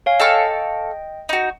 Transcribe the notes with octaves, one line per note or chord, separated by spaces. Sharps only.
C#5 F5 G#5
A4 D#5 F5 G5 C#6
D#4 F#4